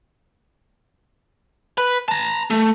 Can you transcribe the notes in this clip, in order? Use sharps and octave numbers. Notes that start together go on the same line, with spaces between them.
B4
A5 A#5
A3